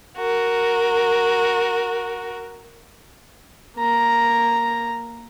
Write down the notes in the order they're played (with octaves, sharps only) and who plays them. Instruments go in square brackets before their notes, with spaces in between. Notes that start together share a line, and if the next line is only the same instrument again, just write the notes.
[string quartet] F#4 A#4
[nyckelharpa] A#3 A#5